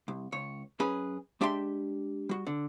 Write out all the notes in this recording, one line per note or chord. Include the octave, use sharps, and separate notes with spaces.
C2
C#2 C#5
F#2 C#4 G#4 B4
G#3 D4 G4 E5 G5 C6
G3 F#4
D3